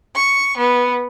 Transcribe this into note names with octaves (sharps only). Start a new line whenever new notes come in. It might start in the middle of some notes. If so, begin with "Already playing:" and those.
C#6
B3